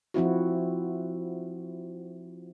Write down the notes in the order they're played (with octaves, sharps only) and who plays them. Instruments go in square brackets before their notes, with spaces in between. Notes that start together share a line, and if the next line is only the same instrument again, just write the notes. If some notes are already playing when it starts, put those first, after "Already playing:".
[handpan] F3 C4 E4 F#4